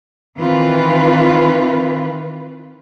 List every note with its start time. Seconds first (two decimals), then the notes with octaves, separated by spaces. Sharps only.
0.37 D#3 E3 C4 F4 B4